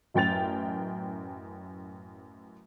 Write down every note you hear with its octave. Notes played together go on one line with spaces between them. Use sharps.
A1 F#2 G5 A6 F7